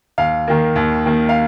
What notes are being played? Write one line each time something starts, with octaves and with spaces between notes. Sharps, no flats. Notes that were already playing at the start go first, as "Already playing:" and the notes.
D#2 F5
D#3 A#3
D#2
D#3 A#3
F5